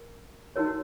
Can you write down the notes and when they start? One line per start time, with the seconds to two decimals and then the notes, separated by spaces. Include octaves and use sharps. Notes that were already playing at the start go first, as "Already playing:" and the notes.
Already playing: A#4
0.56 D#4 F#4 A#4 C#5